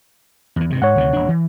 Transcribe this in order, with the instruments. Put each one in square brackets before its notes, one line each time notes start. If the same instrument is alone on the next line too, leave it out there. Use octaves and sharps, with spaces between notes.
[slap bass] E2 E3
G2 C3 D#3
[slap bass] G#2 [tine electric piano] C#5 F#5
[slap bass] D2 C3 D#3
D#1 D4
E3